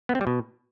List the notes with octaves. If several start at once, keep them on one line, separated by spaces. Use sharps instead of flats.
B3
C4
G3
B2